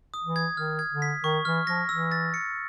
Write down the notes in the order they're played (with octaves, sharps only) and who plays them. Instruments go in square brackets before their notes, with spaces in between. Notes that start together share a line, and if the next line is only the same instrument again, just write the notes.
[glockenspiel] D#6
[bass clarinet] E3
[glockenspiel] G#6
[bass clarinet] D#3 [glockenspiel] F6
[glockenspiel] G#6
[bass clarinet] D3
[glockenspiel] B6
[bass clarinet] D#3 [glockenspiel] C#6
[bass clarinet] E3 [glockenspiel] F6
[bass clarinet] F3 [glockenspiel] A#6
[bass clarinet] E3 [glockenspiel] E6
[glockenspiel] A6
C#7